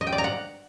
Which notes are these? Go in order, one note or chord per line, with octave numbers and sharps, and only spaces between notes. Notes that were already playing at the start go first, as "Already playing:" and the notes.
D#5
G5
D5
A#5
F#5